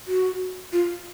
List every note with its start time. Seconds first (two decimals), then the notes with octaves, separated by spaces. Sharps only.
0.07 F#4
0.73 F4